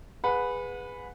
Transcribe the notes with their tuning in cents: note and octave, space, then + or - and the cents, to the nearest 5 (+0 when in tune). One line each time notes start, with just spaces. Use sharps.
G#4 -10 B4 +0 F#5 -30